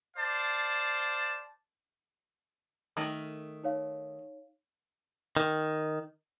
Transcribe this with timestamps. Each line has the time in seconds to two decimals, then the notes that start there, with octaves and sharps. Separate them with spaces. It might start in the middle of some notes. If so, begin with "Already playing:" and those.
0.17 C5 D5 F5 A5
2.97 D#3 A3
3.64 D#4 C#5 F5
5.37 D#3